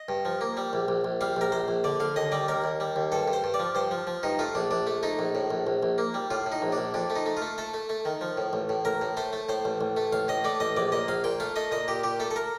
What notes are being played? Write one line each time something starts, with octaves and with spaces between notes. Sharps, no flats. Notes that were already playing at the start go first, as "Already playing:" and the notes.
Already playing: D#5
G2
F3
A#3
G3
A#1
A#1
A#1
G3 F5
A#1 A#4
A#1 C5
A#1
D3 D5
D3 F5
D#2 D#5
G3 D5
D#2 A#4
D#2
G3
D#2
G2 A4
G2
C5
G2
D5
F3
G2 C5
F3
F3
G2 D#4
A3 F4
A#1 D4
A#1 D4
A3
A3 D#4
A#1
A2
A#1
A#1
A#1
A#3
G3
A2 F4
A2
D#4
A#1
D4
A#1
F2 D4
A3
D#4
A3
F4
A3
A3 A4
A3
A3
D#3
F3
A2
A1
A2
A1 A#4
A2
A3 C5
A3
A2 C5
A1
A1
A3
A1 F5
A2 D#5
A3 D5
A1 D#5
A#1 D5
A#2 D#5
A#1 F5
A#2 G5
A3 F5
A3 D#5
A#2 D#5
A#2 G4
A#2 G4
A3 A4
A4
A#4